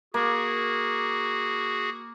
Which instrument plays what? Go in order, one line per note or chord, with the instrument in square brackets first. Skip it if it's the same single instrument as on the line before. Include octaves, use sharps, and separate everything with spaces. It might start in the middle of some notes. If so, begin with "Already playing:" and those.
[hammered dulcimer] A#3 [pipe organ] F#4 G#4